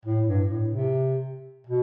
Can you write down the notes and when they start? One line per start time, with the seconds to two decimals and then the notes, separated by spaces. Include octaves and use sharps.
0.06 A2
0.28 G2
0.49 A2
0.70 C3
1.67 B2